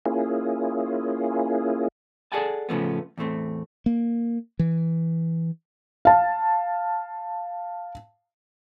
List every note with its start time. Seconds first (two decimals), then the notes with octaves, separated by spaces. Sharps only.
0.06 A#3 C#4 E4 F4 G#4
2.32 G#4 A4 D5 F#5 G#5 A5
2.69 A2 C#3 F3 A3 B3
3.18 E2 A2 A3 C4
3.86 A#3
4.59 E3
6.05 F5 A5